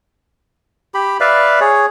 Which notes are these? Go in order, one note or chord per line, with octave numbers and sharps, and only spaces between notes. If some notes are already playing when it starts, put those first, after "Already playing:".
G4 B5
B4 D5 E5 F5
G#4 C#5